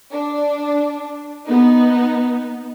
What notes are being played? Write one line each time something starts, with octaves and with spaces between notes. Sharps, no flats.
D4
B3 D#4